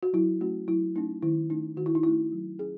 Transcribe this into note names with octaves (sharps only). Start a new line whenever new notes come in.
F#4
F#3 E4
A3 C#4 F#4
F#3 E4
A3 C#4 D#4
D#3 E4
A3 C#4 D#4
D#3 F#4
E4
D#4
A3 C#4 E4
F#3
C#4 G#4